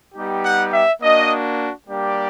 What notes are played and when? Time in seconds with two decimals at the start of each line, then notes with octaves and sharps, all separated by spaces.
0.15 G3 B3 D#4 G4
0.44 F#5
0.72 E5
1.01 A#3 D4 F#4 D#5
1.88 G3 A#3 D4 G4 D5